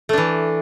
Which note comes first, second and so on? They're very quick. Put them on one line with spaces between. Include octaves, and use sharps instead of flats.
A3 D4 E3